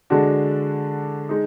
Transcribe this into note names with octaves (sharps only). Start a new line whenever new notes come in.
D3 G#3 D4 F#4
G#3 D#4